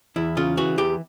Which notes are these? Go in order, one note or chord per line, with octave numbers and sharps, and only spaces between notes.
E2 E4
C#3 F4
E3 F#4
E2 G4